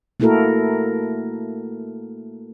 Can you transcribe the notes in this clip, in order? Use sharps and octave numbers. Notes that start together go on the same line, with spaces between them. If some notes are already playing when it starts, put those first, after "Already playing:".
A3 A#3 E4 F#4 A4 A#4